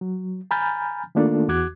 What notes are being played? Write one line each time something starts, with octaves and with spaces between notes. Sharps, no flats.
F#3
G#5 A#5 B5 F6 G6 A6
D#3 A3 A#3 D4 F4 A4
E2 F#4 D6 F#6 G#6